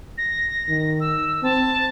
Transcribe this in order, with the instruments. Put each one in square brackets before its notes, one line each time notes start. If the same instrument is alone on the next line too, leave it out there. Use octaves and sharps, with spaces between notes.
[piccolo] A#6
[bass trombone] D#3
[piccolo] E6
[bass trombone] C4 [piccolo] A5